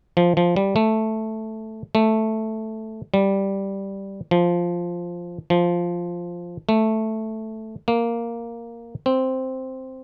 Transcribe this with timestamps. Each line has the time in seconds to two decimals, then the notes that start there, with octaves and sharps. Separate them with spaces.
0.17 F3
0.37 F3
0.56 G3
0.76 A3
1.95 A3
3.14 G3
4.31 F3
5.50 F3
6.69 A3
7.88 A#3
9.06 C4